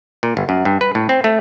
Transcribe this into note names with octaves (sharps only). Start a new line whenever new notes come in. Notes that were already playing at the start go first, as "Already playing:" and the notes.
A#2
G1
F#2
G2
B4
A2
C4
A3